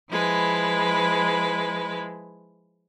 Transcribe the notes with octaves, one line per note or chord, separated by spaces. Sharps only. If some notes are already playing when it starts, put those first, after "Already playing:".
F3 G#3 E4 B4